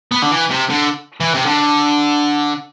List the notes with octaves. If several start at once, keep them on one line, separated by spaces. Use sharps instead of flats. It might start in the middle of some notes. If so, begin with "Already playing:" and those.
B3
D3
E3
C3
D3
E3
C3
D3